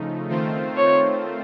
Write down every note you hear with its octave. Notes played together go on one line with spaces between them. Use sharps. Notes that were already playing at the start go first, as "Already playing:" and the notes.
Already playing: C#3 F3 A3 D#4
D#3 A3 C4 F4 C5
C#5